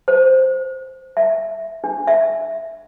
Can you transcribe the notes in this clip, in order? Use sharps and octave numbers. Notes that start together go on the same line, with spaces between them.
C5
E5
D4
E5